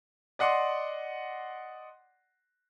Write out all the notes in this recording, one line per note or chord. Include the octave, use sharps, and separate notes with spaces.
D5 D#5 F#5 C6 D6